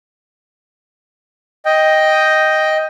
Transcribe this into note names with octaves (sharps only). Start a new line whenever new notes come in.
D#5 G5